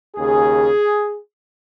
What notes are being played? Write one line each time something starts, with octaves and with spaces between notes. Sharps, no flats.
D#2 C#3 G#4